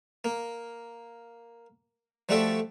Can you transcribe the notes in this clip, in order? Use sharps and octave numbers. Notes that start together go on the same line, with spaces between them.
A#3
F3 G3 A3 F#4 A4 D5